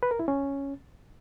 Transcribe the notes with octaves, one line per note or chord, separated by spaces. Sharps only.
B4
A#4
E4
C#4